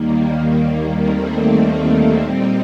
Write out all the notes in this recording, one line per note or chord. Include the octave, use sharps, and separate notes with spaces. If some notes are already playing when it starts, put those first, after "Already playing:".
Already playing: D#2 D#3 G3 A#3
A3 C4
A#2 G3 C4 D#4